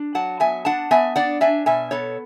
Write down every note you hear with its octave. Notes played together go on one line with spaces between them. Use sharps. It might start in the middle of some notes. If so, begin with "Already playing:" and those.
Already playing: D4
F#3 F#5 A5
B3 E5 G#5
D4 F#5 A5
B3 E5 G#5
D4 D5 F#5
D4 E5 G#5
B2 E5 G#5
B3 A4 C#5